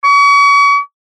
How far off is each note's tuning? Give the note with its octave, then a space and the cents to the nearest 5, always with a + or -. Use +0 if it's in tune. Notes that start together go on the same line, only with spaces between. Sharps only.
C#6 +40